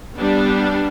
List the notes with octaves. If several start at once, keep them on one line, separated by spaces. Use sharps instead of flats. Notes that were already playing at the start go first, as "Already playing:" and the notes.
G3 B3 D4